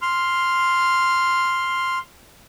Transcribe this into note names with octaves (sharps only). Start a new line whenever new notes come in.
C6 F6